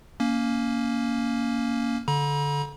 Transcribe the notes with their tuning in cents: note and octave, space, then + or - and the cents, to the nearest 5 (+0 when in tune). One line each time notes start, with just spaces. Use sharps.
A#3 +0 C#4 +15
D3 -25 A#5 +45